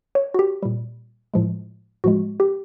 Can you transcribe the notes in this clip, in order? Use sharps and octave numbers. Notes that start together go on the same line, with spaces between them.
C#5
F#4
G4
A#2 G3
A2 F3 G#3
A2 F3 G#3 F#4
G4